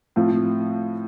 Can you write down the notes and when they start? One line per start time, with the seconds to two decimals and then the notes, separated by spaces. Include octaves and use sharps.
0.16 A2 F3 C4 F4